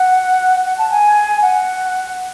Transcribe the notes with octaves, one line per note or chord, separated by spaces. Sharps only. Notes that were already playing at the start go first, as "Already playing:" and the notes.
Already playing: F#5
F#5
A5
G#5
F#5